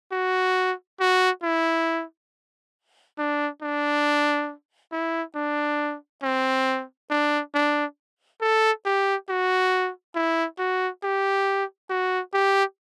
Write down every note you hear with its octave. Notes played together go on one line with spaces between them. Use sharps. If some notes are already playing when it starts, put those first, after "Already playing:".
F#4
F#4
E4
D4
D4
E4
D4
C4
D4
D4
A4
G4
F#4
E4
F#4
G4
F#4
G4